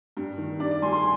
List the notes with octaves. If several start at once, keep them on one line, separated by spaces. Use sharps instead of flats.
G2
D#3
G2 D5
D5
G3 G#5 C6
G#5 C6